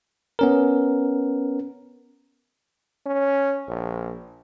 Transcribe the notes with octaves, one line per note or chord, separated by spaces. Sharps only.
B3 C#4 A#4
C#4
A#1